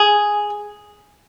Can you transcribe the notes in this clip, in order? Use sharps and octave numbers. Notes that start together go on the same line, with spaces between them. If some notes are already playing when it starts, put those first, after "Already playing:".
Already playing: G#4